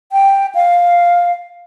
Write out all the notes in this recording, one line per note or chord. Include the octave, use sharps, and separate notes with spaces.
G5
F5